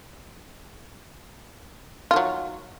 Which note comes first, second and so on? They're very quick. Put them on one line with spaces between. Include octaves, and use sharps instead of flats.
F4 D#3 F#3